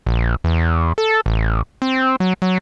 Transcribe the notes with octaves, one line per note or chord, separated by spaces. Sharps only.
A#1
E2
A4
A1
C4
F#3
F#3